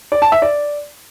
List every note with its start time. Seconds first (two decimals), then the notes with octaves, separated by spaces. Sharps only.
0.12 D5
0.22 A5
0.32 E5
0.42 D5